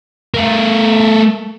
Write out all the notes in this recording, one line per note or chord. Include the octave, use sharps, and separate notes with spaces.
A3 A#4